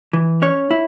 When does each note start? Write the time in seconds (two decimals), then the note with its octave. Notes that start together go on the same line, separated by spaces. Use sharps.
0.13 E3
0.42 C#4 C#5
0.71 E4